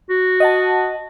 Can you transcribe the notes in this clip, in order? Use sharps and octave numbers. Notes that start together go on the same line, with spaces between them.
F#4
D#5 F#5 A5